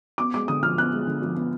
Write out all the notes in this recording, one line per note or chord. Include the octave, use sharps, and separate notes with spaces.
B3 D6
G#3 D6
D3 D#6
F3 F6
B3 F#6
G#3
D3
F3
B3